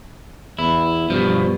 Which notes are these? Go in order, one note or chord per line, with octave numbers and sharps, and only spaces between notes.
E2 E4
G2 B2 F3